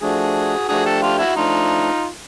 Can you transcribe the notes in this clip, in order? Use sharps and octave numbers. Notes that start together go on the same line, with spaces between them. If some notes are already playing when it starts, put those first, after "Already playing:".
F3 A3 D4 F#4 G#4
F3 A3 D4 F#4 G#4
G4 A4
F4 G4
E4 F#4
F3 A3 D4 D#4 F4